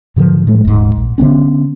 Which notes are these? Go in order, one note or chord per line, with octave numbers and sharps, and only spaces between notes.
G#2 D3 D#3 F3
A2 G#3 A3
D#1 G#2
A#1
D3 F3 B3 C#4